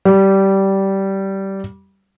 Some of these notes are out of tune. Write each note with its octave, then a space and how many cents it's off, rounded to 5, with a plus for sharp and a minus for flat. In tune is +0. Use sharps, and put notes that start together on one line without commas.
G3 -15